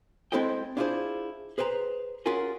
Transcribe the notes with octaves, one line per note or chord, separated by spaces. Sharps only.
G#3 C4 E4 A4 D#5 G5
D4 E4 F4 G4 G#4 C5
G#4 B4 C5 G5 A#5
C#4 F4 F#4 G#4 A#4 G#5